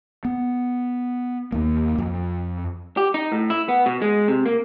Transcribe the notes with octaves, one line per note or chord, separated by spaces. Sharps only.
B3
D#2 A#3
F2
G4
D#4
A2
E4
B3
B2
G#3
C3
A#3